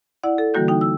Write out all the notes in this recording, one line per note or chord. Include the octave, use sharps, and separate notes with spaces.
E4 D5 F#5
A4
D3 E3 G3 A#3 F#4 G6
D#4 G5
E6